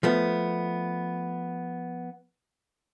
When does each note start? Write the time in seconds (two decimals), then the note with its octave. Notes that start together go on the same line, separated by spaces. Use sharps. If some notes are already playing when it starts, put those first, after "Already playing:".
0.03 F3 A3 B3